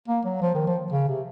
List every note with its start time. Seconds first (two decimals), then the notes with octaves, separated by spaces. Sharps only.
0.08 A#3
0.25 F#3
0.42 F3
0.55 D#3
0.67 F3
0.92 C#3
1.09 C3